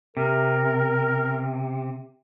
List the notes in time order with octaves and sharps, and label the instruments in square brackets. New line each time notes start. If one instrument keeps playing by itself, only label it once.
[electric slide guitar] C3 [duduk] A#4